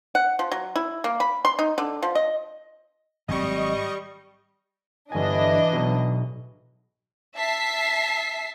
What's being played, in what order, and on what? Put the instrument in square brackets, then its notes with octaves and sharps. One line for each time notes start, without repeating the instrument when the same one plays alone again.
[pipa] F#5
F3
F#3
E4
A#3
B5
C6
D#4
D3
F3
D#5
[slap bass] G#1 F#3 C4 [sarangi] G3 [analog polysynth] D#5 C#6
[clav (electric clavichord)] G1 G#5 [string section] E3 D4 D#5
[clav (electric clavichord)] B1 B2
[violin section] E5 A5 B6 C7